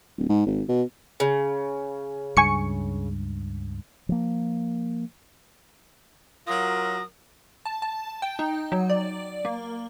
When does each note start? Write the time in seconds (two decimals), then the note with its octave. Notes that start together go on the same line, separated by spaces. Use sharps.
0.18 D1
0.29 G#2
0.46 G#1
0.69 B2
1.20 C#3
2.37 C#2 G2 G#5 C#6 C#7
4.09 F3 A#3
6.47 F#3 F4 A#4 D#6 A#6
7.65 A5
7.82 A5
8.22 G5
8.39 D#4
8.72 F#3
8.90 D5
9.45 A#3